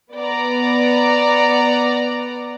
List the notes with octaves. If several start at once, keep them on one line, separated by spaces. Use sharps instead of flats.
B3 D5 F#5 A#5